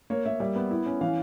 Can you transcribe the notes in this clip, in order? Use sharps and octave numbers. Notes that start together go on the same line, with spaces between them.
A#3 C#5
A#3 E5
G3 E5
B3
E4
C#4
E3 F5